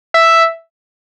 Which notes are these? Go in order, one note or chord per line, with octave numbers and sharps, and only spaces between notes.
E5